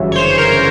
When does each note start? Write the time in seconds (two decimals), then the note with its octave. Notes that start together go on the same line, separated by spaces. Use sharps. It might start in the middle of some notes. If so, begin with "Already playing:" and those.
Already playing: G1 F#2 C#3 E3
0.12 C#5
0.16 C5
0.38 A#4